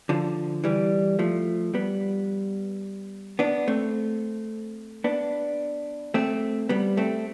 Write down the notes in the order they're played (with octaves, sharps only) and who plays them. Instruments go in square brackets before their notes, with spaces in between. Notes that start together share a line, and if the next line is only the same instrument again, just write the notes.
[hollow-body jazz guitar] D3 F3
E3 G3
F3 A3
G3 B3
B3 D4
A3 C4
B3 D4
A3 C4
G3 B3
A3 C4